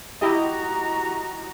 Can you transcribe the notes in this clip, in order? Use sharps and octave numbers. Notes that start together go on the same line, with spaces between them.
E4 F#4 G4 D#5 A#5